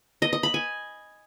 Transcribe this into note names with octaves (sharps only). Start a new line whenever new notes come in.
D#5
D#5
B5
G#5